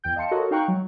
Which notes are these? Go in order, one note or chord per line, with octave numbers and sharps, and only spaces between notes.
E2 G5 G6
D#5 F5 A5 C6 C#7
F#4 A4 A#4 C#5 D#5
D#4 F5 G5 A#5 C#6 F#6
F#3